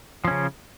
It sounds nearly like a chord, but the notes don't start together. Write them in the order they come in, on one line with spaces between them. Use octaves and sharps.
F3 C#4 C#3